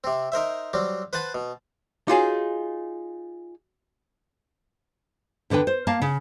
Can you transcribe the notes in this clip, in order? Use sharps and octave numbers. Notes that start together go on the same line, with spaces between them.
C3 C4
D#4 A#4 C5 E5
F#3 G3 C4
B4 C5 F#5 A5 B5
B2
D#4 F4 F#4 G#4 C#5 G#5
E2 D3 D4 B4 G5
C5
A#3 F5 A5
C#3